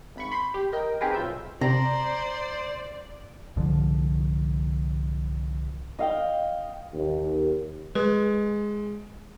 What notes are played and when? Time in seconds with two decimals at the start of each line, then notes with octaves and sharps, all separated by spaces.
0.16 G#1 B5 C#6
0.32 B5 C6 G6 B6 C7
0.54 G4
0.73 A#4 D#5 G5
1.01 C4 D#4 G4 G#4 A#4 B4
1.14 B1 F4 E5 E6 G6
1.61 C3 C5 D5 A#5
3.56 C2 G#2 D3 F3
5.99 D#5 F5 G5
6.93 D#2
7.95 G#3 B4